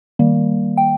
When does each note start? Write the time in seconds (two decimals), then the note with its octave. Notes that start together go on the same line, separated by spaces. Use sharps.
0.19 D#3 G3 A#3
0.77 G5